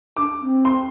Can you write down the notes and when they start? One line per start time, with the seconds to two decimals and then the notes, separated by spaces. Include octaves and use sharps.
0.17 D4 D6
0.41 C4
0.65 C6